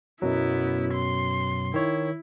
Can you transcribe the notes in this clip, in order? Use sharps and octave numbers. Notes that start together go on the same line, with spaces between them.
F#2 B2 F#3 B3 E4
C6
D#3 E4 C#5